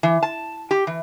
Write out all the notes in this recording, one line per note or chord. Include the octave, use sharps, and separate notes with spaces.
E3
A5
G4
E3